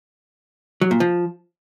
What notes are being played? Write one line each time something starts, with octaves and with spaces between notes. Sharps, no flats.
F#3
A#2
F3